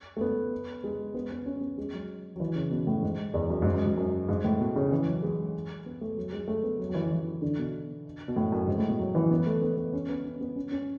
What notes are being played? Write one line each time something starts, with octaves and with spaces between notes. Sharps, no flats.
A3
B3
G#3
B3
B3
C#4
B3
G#3
F#3
F#3
E3
C#3
B2
A2
G#2
E2
F#2
G#2
F#2
G#2
F#2
G#2
A2
B2
C#3
E3
F#3
G#3
B3
A3
F#3
G#3
A3
B3
F#3
F#3
E3
F#3
E3
D3
B2
B2
A2
F#2
G#2
A2
B2
F#3
E3
B3
A3
B3
B3
C#4
B3
C#4
B3
C#4
C#4